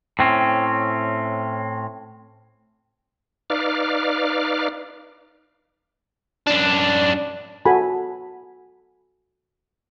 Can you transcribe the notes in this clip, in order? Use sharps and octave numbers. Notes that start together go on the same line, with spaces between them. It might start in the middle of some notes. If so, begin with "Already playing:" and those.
A2 C4 C#4
D#4 B4 D5 F5 D6 F6
F#2 D4
F#4 A4 G#5 B5